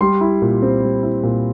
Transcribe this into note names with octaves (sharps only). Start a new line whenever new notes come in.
G3 C6
E4
A#2
C4
G3
E4
A#2